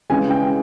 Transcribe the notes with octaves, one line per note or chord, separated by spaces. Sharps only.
C#3 E3 G#3 G#5
G5